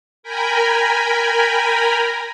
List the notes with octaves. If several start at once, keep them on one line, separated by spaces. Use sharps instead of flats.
A#4 G5 G#5 A#5 B5